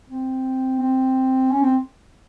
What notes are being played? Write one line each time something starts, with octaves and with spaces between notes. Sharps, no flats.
C4
C4
C#4
C4